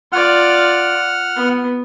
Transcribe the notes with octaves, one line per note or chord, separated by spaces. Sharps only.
F4 D5 F#5 F6
B3